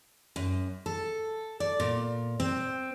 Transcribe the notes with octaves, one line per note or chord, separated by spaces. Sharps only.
F#2
A4
D5
A#2
C4